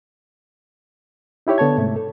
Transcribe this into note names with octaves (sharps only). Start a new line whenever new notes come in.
D#4 E4 G4 C#5 E5
D3 B3 A4 C#5 A5 G#6
G#2 C3 A3
A4